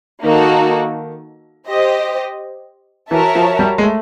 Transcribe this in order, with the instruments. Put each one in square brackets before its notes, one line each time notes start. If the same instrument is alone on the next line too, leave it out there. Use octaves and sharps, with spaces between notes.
[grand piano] D#3 [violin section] A#3 D#4 F#4 A4
[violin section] G4 C5 D#5
[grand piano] E3 [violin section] F#4 A#4 C#5 E5 A5
[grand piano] F3
G3
G#3
A3